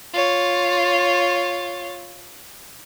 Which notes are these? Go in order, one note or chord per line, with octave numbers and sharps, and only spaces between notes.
F4 C#5